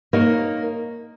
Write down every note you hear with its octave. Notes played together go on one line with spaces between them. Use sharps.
A#3 D#4 A#4 C#5